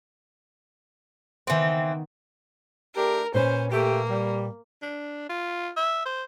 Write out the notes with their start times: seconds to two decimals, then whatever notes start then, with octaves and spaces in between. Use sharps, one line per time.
1.47 D#3 E3 B3 C4
2.96 A3 D4 G4 A#4
3.34 A#2 C#4 B4 C5
3.71 A3 A#3 G4
4.09 G3
4.82 D4
5.29 F4
5.77 E5
6.06 C5